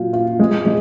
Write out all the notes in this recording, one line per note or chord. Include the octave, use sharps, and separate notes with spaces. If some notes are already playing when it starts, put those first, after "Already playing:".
Already playing: A#2 F#3 F4
F4
G#3
G#3